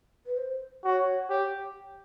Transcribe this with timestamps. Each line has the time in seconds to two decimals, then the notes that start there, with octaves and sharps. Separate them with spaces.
0.26 B4
0.37 C5
0.84 F#4 C#5
1.30 G4